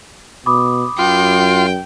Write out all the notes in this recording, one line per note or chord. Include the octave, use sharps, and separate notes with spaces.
B2 B5 D6 D#6
F#2 F4 G5 C6